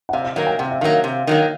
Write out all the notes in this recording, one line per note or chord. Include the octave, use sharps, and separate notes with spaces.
F#5
C3 F5
F5
D#3 F#3 A#3 F5
G5
C3 F#5
E5
D#3 F#3 A#3 F5
C3
D#3 F#3 A#3